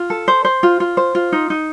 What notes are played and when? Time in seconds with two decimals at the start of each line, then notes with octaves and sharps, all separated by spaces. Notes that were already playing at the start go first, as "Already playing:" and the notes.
Already playing: F4
0.10 A4
0.28 C5
0.45 C5
0.63 F4
0.80 F4
0.97 C5
1.15 F4
1.32 D#4
1.50 D#4